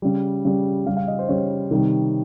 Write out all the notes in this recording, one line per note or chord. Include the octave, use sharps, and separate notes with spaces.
C#3 G3
C#3 G3
C#3 G3 F5
F5
D#5
C5
C#3 G3 C#5
C3 D#3 G3